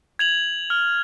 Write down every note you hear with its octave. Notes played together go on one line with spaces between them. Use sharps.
G#6 F7 F#7
F6